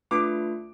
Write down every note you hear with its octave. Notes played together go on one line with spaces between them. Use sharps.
A3 D4 F4 B4 D6